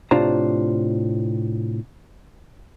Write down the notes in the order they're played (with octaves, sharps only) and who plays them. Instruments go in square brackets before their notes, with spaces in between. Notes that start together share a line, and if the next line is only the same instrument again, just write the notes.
[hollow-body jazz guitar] A2 C3 D4 F4 C5 A#5